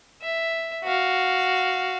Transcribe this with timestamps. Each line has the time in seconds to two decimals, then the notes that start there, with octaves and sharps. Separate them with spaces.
0.22 E5
0.84 F#4 F5